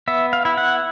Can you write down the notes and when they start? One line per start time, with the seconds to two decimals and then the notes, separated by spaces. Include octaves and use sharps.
0.08 B3 E5
0.33 F5
0.45 E4
0.58 F#5